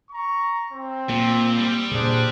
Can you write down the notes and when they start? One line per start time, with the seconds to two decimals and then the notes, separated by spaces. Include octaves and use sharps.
0.10 A#5 C#6
0.73 C4
1.09 A#2 A#3
1.58 G3
1.91 A#2 C#3 D4 G#4 C5